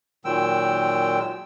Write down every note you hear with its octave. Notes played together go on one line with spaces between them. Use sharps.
A#2 D#3 F#3 G#3 G5 E6